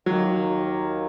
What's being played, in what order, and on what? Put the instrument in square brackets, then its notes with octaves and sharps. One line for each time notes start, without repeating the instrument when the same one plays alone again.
[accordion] D#2 D#3 A#3 [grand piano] F#3